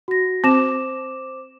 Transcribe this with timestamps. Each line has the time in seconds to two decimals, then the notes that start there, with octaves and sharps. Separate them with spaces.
0.08 F#4 A#6
0.44 C4 C5 D6 E7